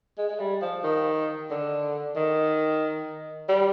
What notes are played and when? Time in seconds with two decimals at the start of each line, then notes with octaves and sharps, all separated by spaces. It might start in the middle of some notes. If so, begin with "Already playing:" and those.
0.18 G#3
0.29 G#3
0.40 G3
0.62 F3
0.84 D#3
1.51 D3
2.16 D#3
3.49 G3